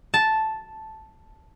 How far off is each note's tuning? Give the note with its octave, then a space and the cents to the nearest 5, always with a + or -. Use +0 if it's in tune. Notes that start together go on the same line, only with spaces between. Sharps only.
A5 -5